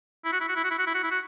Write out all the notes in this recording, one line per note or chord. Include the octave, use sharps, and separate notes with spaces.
E4
F#4
E4
F#4
E4
F#4
E4
F#4
E4
F#4
E4
F#4